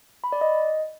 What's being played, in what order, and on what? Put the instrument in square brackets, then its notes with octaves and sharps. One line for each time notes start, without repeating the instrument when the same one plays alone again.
[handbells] B5
D5
D#5